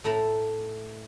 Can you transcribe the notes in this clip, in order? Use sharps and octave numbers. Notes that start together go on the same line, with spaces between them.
A2 A3 E4 A#5